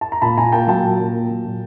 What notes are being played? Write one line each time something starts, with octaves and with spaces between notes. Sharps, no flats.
A5
A#5
A#2 A5 B5
A#2 G#5 A#5
A#3 G5 A5
F#3 G5 A5
A#2
A#2
A#3
F#3
A#2